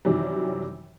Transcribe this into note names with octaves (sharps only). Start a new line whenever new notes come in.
F#2 C3 D#3 E3 F#3 G3